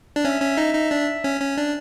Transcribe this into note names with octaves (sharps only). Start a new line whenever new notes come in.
D4
C#4 E5
C#4
D#4
D#4
D4
C#4
C#4
D4